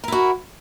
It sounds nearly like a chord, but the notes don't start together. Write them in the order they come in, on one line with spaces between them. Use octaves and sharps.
A#4 E4 F#4